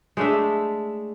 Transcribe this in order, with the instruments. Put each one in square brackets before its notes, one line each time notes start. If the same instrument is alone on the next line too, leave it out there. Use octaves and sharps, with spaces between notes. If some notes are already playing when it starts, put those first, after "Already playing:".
[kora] G#3 A3 D4 E5